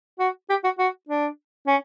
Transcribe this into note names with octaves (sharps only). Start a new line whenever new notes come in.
F#4
G4
F#4
F#4
D4
C#4